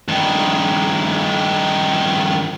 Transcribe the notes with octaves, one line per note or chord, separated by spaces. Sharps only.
G2 D#3